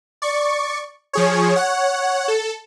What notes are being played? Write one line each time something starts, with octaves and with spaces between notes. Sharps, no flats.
D5 C#6
F3 G#4 C#5
C#5 F#5
A4